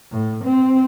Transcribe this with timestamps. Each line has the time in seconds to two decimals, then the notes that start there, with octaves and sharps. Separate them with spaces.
0.12 A2
0.44 C4